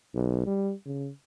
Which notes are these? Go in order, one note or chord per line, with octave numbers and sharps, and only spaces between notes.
B1
G3
C#3